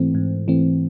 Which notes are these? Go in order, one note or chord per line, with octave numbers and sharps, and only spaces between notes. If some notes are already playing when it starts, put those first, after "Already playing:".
Already playing: G#2 E3 A3 C4
G#2
E3 A3 C4